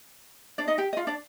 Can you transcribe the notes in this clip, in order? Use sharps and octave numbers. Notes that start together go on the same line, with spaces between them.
D4 D5
D#4 D#5
G4 G5
D#5
F4 F5
D4 D5